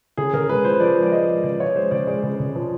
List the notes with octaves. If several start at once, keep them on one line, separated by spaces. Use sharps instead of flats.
C#3 G#4
C#3 A#4
G#3 B4
F3 C5
F3 D5
G#3
D5
G#3 D#5
G#3
C#3 D5
F3 C#5
G#3 C5
C#3 D5
G#3 D5
C#3
C#3
F3